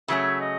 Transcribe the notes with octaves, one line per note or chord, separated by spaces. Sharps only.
C#3 F#3 A3 C#4 E5
D#5